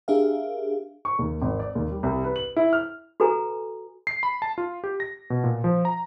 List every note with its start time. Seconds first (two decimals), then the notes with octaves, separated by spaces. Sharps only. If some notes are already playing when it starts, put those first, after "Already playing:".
0.08 D4 G4 G#4 A#4 E5 F5
1.05 C#6
1.19 D#2
1.42 G#1
1.60 D5
1.75 D#2
1.91 G3
2.03 C2
2.24 B4
2.36 F#7
2.56 E4
2.73 F6
3.20 F#4 A4 B4 G#5 A#5
4.07 C7
4.23 B5
4.42 A5
4.58 F4
4.84 G4
5.00 A#6
5.30 B2
5.44 A#2
5.64 F3
5.85 A#5